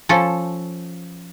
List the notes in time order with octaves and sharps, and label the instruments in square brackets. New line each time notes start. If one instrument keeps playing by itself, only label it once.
[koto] F3 C#4 A4